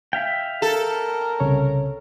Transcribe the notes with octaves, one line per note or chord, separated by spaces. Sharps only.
E5 F5 G5
A4 A#4
C2 C#3 C#5